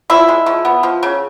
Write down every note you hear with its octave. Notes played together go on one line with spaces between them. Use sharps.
F3 E4
G#3
F3
B3
F3
C#3